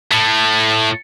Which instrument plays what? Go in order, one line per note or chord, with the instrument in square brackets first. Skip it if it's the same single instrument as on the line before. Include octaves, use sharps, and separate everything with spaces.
[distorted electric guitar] A2 A3